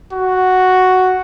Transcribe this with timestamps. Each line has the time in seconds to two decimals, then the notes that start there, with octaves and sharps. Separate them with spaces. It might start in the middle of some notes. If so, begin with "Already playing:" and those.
0.13 F#4